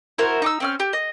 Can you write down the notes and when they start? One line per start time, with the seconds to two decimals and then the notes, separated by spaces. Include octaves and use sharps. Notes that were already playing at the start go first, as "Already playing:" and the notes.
0.18 E4 F#4 A#4 C5
0.42 D#4 D6 E6
0.60 C4 C#4 F6
0.80 G4
0.93 D#5